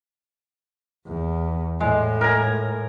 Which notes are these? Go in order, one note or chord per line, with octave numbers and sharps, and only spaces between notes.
E2
A2 G#3
A#4 G#5 A#5